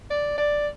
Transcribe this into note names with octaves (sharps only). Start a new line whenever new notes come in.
D5
D5